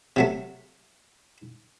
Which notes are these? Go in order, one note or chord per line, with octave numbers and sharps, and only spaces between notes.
C3 F#3 A3